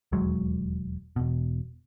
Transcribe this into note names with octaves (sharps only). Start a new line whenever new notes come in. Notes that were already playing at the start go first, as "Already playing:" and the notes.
E1 D#2 F#3 G#3
E1 B2